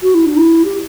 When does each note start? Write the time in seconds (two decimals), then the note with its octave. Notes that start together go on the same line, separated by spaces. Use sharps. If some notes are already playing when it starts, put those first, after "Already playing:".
0.02 F#4
0.14 E4
0.25 D4
0.36 E4
0.64 G4